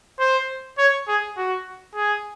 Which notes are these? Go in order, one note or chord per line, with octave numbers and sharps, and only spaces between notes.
C5
C#5
G#4
F#4
G#4